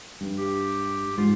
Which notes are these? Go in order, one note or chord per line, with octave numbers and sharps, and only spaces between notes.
G2
G4
G#2 F4